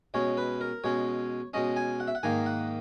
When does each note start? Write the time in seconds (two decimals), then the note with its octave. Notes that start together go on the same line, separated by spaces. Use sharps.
0.14 B2 G#3 C#4 C#5
0.37 B4
0.61 A#4
0.84 B2 G#3 C#4 C#5
1.54 B2 G#3 C#4 D#5
1.76 G#5
2.00 F#5
2.07 E5
2.15 F#5
2.23 G#2 D#3 A#3 D#4 G#5
2.46 F#5